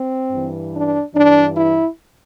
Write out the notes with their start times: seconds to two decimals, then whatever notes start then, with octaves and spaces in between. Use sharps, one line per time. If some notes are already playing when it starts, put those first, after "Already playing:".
Already playing: C4
0.31 G2 E3
0.73 D4
1.14 G2 E3 D4
1.56 E4